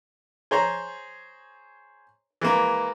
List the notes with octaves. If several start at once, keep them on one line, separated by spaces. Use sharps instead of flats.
G#4 C5 C#5 A#5
E3 G#3 A#3